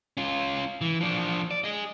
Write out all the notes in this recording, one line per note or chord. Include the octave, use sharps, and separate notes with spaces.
C#4 F4
E3
F3 D4
D5
G#4 D#5